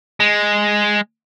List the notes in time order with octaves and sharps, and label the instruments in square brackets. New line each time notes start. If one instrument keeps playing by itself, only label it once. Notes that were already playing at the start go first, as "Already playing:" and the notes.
[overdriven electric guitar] G#3